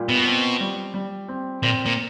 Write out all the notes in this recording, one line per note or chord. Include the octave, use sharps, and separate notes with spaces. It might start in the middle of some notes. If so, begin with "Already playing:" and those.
Already playing: A#2 G3
B2
C4
G3
G3
C4
A#2 C4
A#2